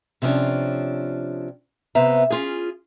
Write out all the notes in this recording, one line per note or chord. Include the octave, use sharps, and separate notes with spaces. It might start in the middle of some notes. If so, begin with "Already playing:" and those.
C3 F3 C#4 D4
C3 B3 C5 E5 A#5
C#4 F4 G#4